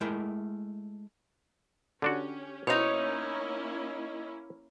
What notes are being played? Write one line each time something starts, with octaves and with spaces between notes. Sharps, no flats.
G#3 A3 E4 A#4 G5
D3 C#4 D4 F#4 G4
B2 A#3 C#4 D#4 E4 C5 C#5 A#5